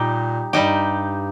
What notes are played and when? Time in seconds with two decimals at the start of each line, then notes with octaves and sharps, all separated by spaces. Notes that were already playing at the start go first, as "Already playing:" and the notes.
Already playing: A#2 G3 D#4 G4
0.53 G2 G3 D#4 G4